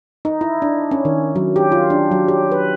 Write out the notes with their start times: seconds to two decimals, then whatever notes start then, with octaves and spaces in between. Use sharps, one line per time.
0.25 D#4
0.41 E4
0.62 D4
0.91 C#4
1.05 D#3
1.36 F#3
1.56 G4
1.72 F4
1.90 D4
2.11 F#3
2.28 G4
2.52 B4